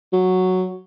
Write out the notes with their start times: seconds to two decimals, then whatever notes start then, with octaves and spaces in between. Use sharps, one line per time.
0.13 F#3